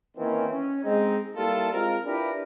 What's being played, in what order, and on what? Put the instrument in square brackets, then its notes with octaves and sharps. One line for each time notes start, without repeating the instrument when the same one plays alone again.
[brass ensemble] D#3 E3 A#3 C4 C#4
C#4
G#3 C4 D#4
G3 A#3 E4 F4 A4
G#3 C4 F4 A#4
D4 E4 F4 G4 A#4 B4